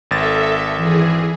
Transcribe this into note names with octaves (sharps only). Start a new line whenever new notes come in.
G#1 A4 E5 A6
E3 G#4